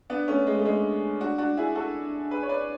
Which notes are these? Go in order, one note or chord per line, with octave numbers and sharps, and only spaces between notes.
B3 D4
A3 C#4
G#3
A3
G#3
D4 F#4
D4 F#4
E4 G#4
F#4 A4
G#4 B4
C#5
B4 D5